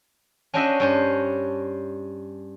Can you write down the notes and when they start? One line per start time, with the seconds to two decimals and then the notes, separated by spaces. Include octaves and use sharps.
0.54 C#4 D4 F#4 C5 D#5 E5
0.80 G2 C#4 C5